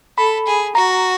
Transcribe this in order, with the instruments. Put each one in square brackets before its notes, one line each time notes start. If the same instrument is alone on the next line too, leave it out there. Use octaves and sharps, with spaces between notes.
[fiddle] A4 [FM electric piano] B5
[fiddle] G#4
[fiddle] F#4 [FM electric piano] A#5